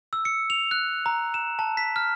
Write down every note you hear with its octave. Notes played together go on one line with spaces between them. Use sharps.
E6
C#7
F7
F#6
A#5
E7
A5
B6
F6